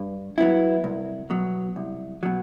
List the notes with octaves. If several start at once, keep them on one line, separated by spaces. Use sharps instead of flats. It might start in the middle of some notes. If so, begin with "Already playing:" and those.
Already playing: G2
F#3 B3 E4
C2
B2 F#3
C2
B2 F#3